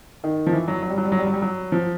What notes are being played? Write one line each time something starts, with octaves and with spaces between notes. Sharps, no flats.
D#3
F3
E3
F#3
F#3
G3
F#3
G3
F#3
G3
F#3
G3
F#3
F3